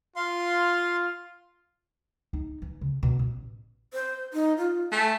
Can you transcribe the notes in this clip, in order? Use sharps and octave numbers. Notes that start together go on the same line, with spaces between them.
F4 F5 C6
D#4
E3
C#3
B2
A1
C5
D#4
F4
A3 G#5